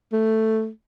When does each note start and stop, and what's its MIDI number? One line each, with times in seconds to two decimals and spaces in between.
0.12 0.69 57